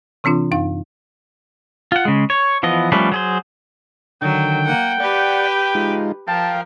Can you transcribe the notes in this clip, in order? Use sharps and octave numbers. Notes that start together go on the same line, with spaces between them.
C3 E3 C4 D4 F4
F#2 D#4 F5
F4 F#5
C#3 G#3
C#5
E3 F3 B3 D#5
F3 G3 A3 C#4 B4
F#3 G#4 C5
D3 D#3 F#3 G5
A#3 F#5
G4 B4 D5 F#5
G#3 D#4 F4
F3 A#4 F5 G5 A5